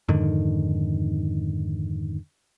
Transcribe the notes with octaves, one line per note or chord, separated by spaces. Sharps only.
F2 G#2 D3 D#3